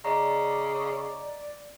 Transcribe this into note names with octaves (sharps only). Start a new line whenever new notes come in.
C#3 D5 D#5 A#5